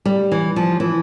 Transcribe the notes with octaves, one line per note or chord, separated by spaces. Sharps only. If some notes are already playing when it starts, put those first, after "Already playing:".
G3
E3
F3
E3